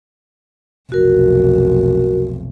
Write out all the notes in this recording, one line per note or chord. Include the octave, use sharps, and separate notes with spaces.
F1 B1 F#4 A#4